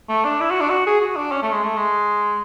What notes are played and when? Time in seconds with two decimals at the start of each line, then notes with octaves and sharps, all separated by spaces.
0.09 A3
0.25 D4
0.41 E4
0.51 F#4
0.61 D4
0.70 F#4
0.87 G#4
1.01 F#4
1.16 D4
1.32 C#4
1.43 A3
1.52 G#3
1.63 A3
1.77 G#3